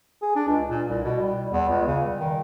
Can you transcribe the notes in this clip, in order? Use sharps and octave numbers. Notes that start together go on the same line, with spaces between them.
G#4
D4
C#2
A#2
C2
B2
G3
E2
C#2
C#3
G3
D#3